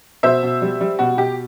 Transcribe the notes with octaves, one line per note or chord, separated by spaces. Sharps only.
B2 C5 E5
B2
G3
G3
B2 F#4
B2 G4